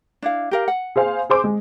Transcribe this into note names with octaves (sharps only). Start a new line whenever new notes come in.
D4 E4 F5
G4 A#4 F5
F#5
G#4 C5 F5
G#4 C5 D6
G#3